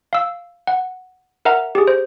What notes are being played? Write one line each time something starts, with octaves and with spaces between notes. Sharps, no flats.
F5 E6
F#5
A#4 E5 F#5 A#5
G4 G#4
C5